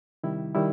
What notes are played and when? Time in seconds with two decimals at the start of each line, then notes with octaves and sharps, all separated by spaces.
0.23 C3 D#3 G3 E4
0.55 D#3 G3 E4